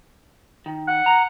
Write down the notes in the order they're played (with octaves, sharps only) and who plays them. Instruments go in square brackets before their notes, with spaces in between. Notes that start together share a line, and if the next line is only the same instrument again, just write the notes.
[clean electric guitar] D#3
[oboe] F#5
[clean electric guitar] A#5